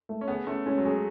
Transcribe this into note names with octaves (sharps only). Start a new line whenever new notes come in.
A3
C#4
B3 G#4
A3 C#4
G#3 C#4
F#3
G#3 G#4